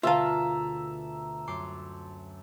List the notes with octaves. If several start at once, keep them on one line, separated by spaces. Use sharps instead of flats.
D2 B2 D3 F4 E5 F5 A5 A#5
F#2 C6 D6